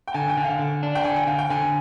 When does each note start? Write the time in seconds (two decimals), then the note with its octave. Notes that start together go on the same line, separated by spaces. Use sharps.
0.07 G5
0.14 D3 G#5
0.29 G5
0.37 D3
0.45 F5
0.59 D3
0.83 D4
0.95 G5
1.04 D3 G#5
1.16 G5
1.27 D3 F5
1.39 G5
1.50 D3 G#5